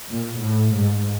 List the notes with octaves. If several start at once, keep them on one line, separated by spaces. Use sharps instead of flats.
A#2
A2
G#2